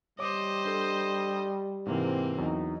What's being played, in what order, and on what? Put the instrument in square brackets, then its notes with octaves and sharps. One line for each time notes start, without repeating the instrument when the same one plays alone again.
[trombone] G3 [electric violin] C5 D#5 [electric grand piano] C#5 D6
[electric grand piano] D4 A4
[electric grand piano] G#2 C3 E3 [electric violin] A#3 C4
[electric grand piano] E2 F#3 [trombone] D#4